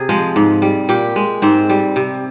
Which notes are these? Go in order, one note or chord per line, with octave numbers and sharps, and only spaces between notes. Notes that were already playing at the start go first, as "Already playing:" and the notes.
Already playing: C3 G#4
F3 G#3
G#2
G3
A#2 G4
G#3
G#2 C4
G3
C3